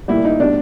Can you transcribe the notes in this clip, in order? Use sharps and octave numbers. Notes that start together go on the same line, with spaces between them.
A#2 G3 E4
D#4
B2 G3 D4